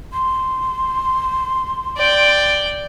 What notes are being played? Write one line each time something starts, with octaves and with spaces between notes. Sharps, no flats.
C6
D5 G5